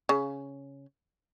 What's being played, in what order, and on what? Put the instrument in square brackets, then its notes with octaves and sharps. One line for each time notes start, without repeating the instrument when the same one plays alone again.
[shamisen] C#3